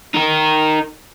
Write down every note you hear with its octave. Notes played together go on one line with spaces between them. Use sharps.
D#4 A#4